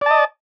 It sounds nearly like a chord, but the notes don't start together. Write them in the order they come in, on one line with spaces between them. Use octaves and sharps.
D5 A5 D#5